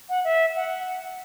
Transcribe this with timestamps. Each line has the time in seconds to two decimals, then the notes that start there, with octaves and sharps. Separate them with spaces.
0.09 F#5
0.24 E5
0.56 F#5